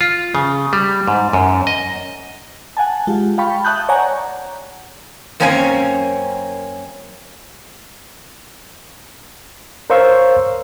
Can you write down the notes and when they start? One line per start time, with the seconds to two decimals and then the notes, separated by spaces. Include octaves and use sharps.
0.01 F4
0.35 C#3
0.73 G3
1.08 G#2
1.33 F#2
1.67 D#5
2.77 F#5 G#5 A5
3.07 G#3 F4 G4
3.38 F5 G5 A5 B5 C#6
3.65 E5 A5 D#6 F#6 G6
3.89 C#5 D5 F#5 G#5 A#5 C#6
5.40 F#2 A#3 C4 C#4 F#4 G#5
9.90 A#4 C5 C#5 F5 C#6 E6